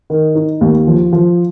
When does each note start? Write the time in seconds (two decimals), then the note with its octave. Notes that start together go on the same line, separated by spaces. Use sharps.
0.10 D#3
0.35 D#4
0.61 D#2
0.87 F3
1.13 F3